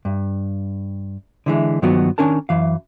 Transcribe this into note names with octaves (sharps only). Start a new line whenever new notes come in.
G2
D3 E3 G#3
G2 D#3 F3 F#3 B3 F#4
D#3 C#4 D4 A#4 A5
F#2 E3 F5